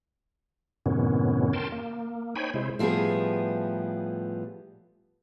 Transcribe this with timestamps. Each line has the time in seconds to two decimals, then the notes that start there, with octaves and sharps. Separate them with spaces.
0.86 F#2 A2 C3 D#3 B3 C#4
1.53 A#4 G5 A5 C6
1.72 A#3
2.36 D#4 C5 C#5 G5 G#5 B5
2.54 C3 G#3 E4 C5
2.79 A2 F3 G3 B3 G#4